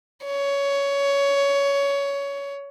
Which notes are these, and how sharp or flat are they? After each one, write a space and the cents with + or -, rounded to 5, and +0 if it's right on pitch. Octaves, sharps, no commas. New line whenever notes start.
C#5 +15